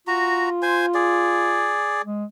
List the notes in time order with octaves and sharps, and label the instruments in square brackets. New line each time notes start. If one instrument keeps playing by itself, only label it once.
[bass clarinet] F4 [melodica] F#4 A#5
[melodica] C5 G#5
G#4 D5
[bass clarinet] G#3